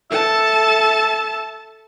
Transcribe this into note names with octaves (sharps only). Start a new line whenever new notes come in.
A4 E5 A5